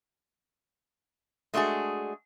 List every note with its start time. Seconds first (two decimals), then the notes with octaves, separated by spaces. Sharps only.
1.54 G#3 A3 D4 F#4 G#4